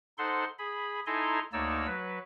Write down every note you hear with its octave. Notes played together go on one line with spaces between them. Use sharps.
D#4 A4 C5 F#5 C6
G#4 B5
D#4 E4 A4 G#5 A#5 C6
D2 A#3 D#4 C#5 D5 E6
F#3 B4